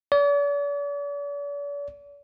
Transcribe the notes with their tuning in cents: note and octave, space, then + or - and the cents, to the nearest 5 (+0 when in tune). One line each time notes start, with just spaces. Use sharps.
D5 -45